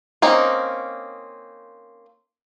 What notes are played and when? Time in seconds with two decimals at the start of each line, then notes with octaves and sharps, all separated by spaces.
0.22 A#3 C4 C#4 D#4